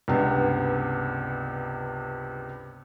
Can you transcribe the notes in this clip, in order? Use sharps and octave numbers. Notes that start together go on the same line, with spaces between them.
C#2 G2 C3 B3